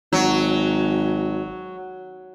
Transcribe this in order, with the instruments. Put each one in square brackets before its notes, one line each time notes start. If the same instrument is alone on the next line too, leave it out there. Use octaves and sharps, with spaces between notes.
[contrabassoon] G#1 [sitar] F#3